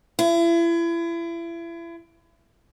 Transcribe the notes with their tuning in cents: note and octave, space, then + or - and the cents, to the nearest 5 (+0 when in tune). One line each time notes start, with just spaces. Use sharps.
E4 +35